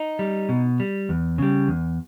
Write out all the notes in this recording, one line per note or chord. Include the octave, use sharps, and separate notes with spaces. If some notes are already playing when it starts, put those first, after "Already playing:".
Already playing: D#4
G3
B2
G3
E2
C#3 G3
E2